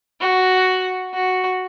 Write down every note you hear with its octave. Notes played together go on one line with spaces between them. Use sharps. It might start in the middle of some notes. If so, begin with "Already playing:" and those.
F#4
F#4